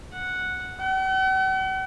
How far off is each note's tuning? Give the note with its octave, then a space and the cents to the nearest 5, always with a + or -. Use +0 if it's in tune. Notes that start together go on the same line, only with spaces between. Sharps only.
F#5 -5
F#5 +45